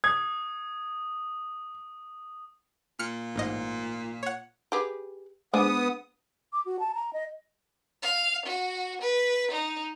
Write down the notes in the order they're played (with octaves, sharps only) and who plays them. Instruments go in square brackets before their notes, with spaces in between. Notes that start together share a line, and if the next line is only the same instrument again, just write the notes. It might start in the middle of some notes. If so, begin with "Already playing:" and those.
[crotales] D#6 [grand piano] G#6
[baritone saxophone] A#2 [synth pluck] F6 C#7
[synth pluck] A1 G#2 D#5
C#5 F#5
[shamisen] G4 G#4 B4
[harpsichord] G#2 [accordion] B3 D#6 [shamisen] D4
[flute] D6
F#4
A5
A#5
D#5
[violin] F5
F#4
B4
D#4